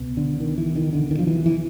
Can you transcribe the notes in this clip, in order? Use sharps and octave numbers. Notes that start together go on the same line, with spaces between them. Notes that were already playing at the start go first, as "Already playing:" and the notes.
Already playing: C#2 B2
D3
D#3
E3
D#3
D3
D#3
F3
E3
E3